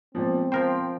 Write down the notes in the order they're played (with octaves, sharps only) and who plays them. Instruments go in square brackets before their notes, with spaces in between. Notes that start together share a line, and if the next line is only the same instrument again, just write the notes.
[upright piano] A#2 F3 [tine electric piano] G#3 B3 [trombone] C4
[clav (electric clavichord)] F3 A#4 C5 [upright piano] G5 C6